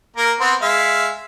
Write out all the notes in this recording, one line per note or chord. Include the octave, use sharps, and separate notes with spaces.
A#3 A#4
B3 C4 C5
G#3 E5 F5